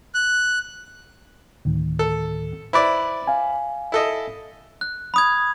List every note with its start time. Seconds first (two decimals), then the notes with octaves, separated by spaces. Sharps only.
0.14 F#6
1.65 D2 A2 D#3
1.99 A4
2.73 E4 B4 C5 D5
3.27 F5 G#5
3.92 E4 A4 D#5
4.81 F#6
5.14 B5 D#6 G#6